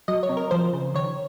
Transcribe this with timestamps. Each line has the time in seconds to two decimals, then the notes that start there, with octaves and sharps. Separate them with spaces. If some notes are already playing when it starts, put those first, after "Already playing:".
0.08 F#3 D#5
0.23 C#5
0.29 C3
0.37 A#4
0.51 F3 C5
0.73 C#3
0.94 D#3 C#5